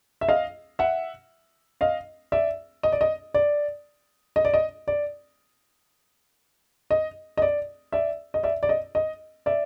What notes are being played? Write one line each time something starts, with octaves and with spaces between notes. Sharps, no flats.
E5
D#5 F5
E5 F#5
D#5 F5
D5 E5
D#5
D5
D#5
D5
D#5
D5
D#5
D5
D#5
D#5
D5
D5 E5
D#5
D5 E5
D5
D#5
D#5
D5 E5